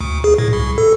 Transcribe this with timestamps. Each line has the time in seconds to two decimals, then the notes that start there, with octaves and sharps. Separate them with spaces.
0.01 D2
0.24 G#4
0.38 A2
0.53 C2
0.78 A4